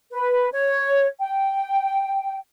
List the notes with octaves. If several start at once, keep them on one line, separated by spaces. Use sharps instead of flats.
B4
C#5
G5